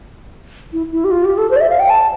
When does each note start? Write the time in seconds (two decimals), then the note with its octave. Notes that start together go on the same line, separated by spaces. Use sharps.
0.73 E4
0.92 E4
1.04 G4
1.11 F4
1.24 G4
1.38 A4
1.51 C5
1.56 D5
1.61 E5
1.70 F5
1.80 G5
1.90 A5